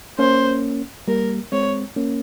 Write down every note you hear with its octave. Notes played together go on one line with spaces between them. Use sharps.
A#3 C#4 C5
G3 A#3 A#4
G#3 C4 C#5
A#3 C#4